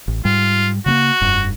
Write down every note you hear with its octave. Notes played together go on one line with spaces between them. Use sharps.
A1
G#2 G3 F4
C#3 A3 A#3 F#4
F1 G2